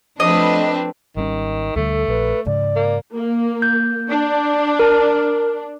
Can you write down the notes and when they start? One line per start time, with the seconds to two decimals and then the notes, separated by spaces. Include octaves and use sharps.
0.20 F3 A3 C4 D4 B4 D#5
1.17 G#1 D#3 G3 C#4
1.76 D2 D3 G3 A3 A4
2.08 A#1 B4
2.46 G#2 C#3 G#3 D5
2.76 A#3
3.14 A#3
3.62 G6
4.08 D4
4.79 A#4